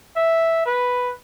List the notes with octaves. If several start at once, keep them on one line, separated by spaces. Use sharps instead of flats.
E5
B4